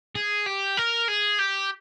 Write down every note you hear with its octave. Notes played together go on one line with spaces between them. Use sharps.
G#4
G4
A#4
G#4
G4